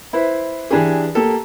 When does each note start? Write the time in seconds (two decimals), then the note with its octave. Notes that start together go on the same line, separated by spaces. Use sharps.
0.13 E4 B4 C5
0.71 E3 D4 G4 G#4
1.15 A#3 G4 A4